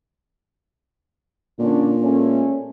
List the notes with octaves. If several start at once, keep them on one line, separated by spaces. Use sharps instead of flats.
A#2 D3 C#4 D4
G#3 A3 C#4